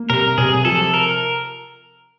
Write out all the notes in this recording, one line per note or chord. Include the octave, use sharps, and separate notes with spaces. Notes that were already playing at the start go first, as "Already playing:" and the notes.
Already playing: A#3
C3 A#4
C3 G#4
F3 A4
A#4